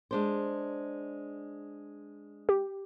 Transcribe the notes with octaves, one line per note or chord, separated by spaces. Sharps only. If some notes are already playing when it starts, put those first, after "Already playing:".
G#3 D4 C5
G4